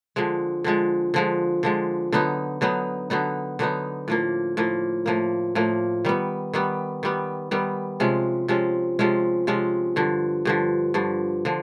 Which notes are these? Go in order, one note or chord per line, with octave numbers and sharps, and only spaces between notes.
D3 F3 G#3
D3 F3 G#3
D3 F3 G#3
D3 F3 G#3
D3 F#3 B3 D#4
D3 F#3 B3 D#4
D3 F#3 B3 D#4
D3 F#3 B3 D#4
A2 F3 A#3
A2 F3 A#3
A2 F3 A#3
A2 F3 A#3
D#3 G3 B3
D#3 G3 B3
D#3 G3 B3
D#3 G3 B3
C3 F3 G#3 C#4
C3 F3 G#3 C#4
C3 F3 G#3 C#4
C3 F3 G#3 C#4
G2 D3 F3
G2 D3 F3
G2 D3 F3
D3 F3